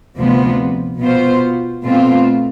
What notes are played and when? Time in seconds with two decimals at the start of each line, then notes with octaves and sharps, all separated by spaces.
0.17 D2 C3 F3 B3
0.99 B2 B3 F4 C5
1.82 B2 A3 C4 F4